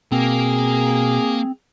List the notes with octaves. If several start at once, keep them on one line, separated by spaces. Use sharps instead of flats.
B2 A#3 C4 G#4